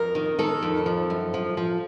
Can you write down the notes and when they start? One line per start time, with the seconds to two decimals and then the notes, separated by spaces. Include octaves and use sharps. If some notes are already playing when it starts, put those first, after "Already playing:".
Already playing: F2 A#4
0.15 D#3
0.39 D#3 A4
0.62 F2
0.86 F3
1.10 F#2
1.34 F3
1.57 F3